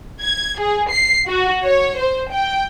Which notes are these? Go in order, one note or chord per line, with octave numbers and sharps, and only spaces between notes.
G#6
G#4
C7
F#4
C#5
C5
G5